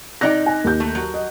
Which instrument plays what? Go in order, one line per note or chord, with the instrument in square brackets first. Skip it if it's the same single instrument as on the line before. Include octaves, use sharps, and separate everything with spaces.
[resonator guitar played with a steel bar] C3 D#4 G5 [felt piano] D5 F#6 A#6
[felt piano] G#5
D#2 G6
[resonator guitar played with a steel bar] A3
F#3
[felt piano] D#5